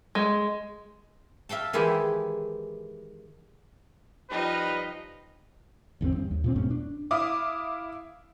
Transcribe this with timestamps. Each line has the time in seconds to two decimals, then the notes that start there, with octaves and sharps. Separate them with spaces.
0.15 G#3
1.49 E5 F5 G5 A5
1.73 D#3 E3 G#3 E4 G4
4.31 F3 G3 D#4 B4 D#5
6.01 G#1 E2 C3 C4
6.16 G2
6.31 D#2
6.44 A#2 G3 C4
6.56 E1 G#2 B2 C#4
6.71 D4
7.11 E4 F5 D6 D#6